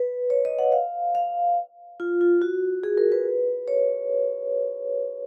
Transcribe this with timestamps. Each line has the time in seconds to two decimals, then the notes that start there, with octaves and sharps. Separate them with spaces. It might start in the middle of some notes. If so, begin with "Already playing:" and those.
Already playing: B4
0.30 C#5
0.45 D#5
0.59 F#5
0.72 F5
1.15 F5
2.00 F4
2.21 F4
2.42 F#4
2.83 G#4
2.98 A#4
3.12 B4
3.68 C#5